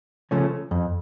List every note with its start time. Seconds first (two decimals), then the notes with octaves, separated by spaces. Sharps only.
0.31 C#3 F3 A3 C#4
0.71 F2